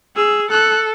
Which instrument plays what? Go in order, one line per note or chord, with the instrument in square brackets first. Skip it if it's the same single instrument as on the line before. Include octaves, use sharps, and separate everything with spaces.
[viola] G#4 [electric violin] E6
[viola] A4 [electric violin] F#6